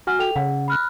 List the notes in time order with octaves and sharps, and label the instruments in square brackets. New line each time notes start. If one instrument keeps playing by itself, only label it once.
[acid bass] F#4 [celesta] G#5 F6
[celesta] A4 G5 F7
[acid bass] C#3 [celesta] F#5
[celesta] B5 F6 F#6